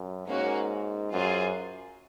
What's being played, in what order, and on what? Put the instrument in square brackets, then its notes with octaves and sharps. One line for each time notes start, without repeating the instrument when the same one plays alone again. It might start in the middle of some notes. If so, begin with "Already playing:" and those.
Already playing: [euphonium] F#2
[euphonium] G#2 [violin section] A#3 C#4 F#4
[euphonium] F#2 [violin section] F4 G#4 C5